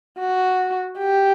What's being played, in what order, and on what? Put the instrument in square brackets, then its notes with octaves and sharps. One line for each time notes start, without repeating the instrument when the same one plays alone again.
[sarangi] F#4
G4